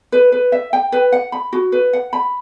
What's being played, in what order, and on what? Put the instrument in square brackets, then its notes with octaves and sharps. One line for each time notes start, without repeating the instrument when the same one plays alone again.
[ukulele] B4
B4
E5
G5
B4
F#5
B5
F#4
B4
F#5
B5